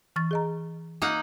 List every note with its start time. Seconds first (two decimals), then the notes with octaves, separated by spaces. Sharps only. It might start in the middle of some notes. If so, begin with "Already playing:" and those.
0.16 E3 C#6 A6
0.31 G#4 D#5 A#5
1.02 A#3 D#4 F#5